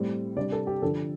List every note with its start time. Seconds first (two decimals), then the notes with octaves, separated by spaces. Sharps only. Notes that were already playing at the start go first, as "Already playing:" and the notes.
Already playing: A2 G3 C4
0.36 C3 G3 D4 D5
0.52 A4
0.67 G4
0.82 D3 F3 D4 A4